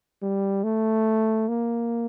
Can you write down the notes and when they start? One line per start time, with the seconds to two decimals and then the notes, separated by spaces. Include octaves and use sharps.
0.22 G3
0.64 A3
1.49 A#3